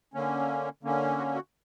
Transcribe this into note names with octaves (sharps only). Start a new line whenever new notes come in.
D3 A#3 C#4
D3 A#3 C#4
F#4
F#4